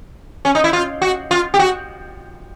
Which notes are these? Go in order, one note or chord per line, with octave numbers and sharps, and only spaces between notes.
C#4
D#4
E4
F4
F#4
F4
G4
F#4